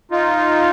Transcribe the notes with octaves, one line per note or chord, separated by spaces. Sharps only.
D#4 F4